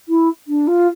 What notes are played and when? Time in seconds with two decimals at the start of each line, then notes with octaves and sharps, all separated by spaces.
0.08 E4
0.47 D4
0.67 F4